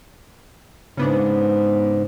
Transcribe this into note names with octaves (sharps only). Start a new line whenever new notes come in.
G#2 C#3 B3 D4